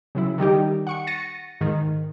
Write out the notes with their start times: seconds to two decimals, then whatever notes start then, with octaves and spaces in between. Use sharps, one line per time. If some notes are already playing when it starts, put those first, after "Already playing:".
0.15 C#3 F#3 E4
0.38 D#3 G3 D#4 G4
0.87 F#5 C#6 C#7
1.07 A6 A#6 C#7 D#7
1.61 G#2 D#3